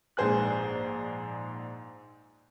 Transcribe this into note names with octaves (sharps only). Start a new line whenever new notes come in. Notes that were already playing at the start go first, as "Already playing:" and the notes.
A#1 G#2 G#4 C5 G#5 F#6